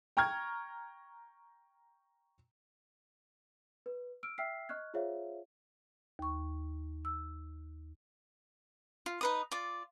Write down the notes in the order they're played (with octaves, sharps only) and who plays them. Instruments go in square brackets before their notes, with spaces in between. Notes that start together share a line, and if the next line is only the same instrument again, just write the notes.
[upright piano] G5 A#5 C#6 F6 G#6
[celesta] B4
E6 F6 D7
E5 G5 E6 F6 B6 C7
D#5 C#6 F6 F#6 G#6
F4 G#4 C5 C#5 E5 F5
[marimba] D#2 C#6
E6
[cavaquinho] F4
D#4 B4 D#6
F4 D5